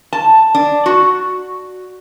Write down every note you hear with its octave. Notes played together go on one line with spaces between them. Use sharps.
A5
D4
F#4